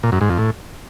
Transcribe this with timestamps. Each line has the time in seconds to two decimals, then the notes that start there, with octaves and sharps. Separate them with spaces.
0.03 A#2
0.12 F#2
0.21 G#2
0.30 F2
0.38 A2